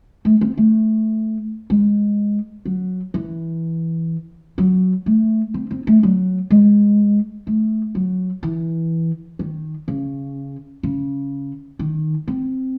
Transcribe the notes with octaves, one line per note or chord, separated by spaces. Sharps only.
A3
C4
A3
G#3
F#3
E3
F#3
A3
C4
C4
A3
F#3
G#3
A3
F#3
E3
D#3
C#3
C#3
D#3
C4